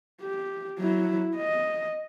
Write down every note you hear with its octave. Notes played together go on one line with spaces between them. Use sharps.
G4
F#3 E4
D#5